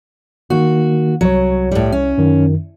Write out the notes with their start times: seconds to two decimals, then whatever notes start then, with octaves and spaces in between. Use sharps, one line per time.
0.50 D#3 A#3 F#4
1.21 C2 F#3 C#5
1.71 A2 G3
1.92 C#4
2.18 F#2 D#3